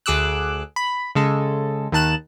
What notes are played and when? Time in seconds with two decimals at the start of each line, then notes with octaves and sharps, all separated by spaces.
0.06 D2 G#4 D6 E6 F#6
0.76 B5
1.15 C#3 G#3 A4
1.92 D#2 D#3 A5 F#6 E7